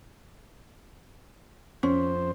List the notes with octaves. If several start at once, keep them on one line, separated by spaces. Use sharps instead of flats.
F2 C#4 C5